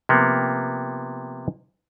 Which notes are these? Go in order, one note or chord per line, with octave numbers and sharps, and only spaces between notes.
C3 F3 A#3 B3